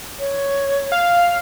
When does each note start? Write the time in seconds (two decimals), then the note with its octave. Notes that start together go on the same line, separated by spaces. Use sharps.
0.19 C#5
0.92 F5